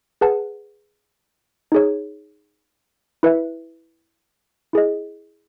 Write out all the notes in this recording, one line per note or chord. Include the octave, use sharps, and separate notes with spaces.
G#4 B4 F#5 A5
D#4 G#4 C#5
E4 B4 E5
E4 G#4 D#5